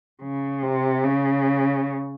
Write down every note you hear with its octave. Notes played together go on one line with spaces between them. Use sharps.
C#3
C3
C#3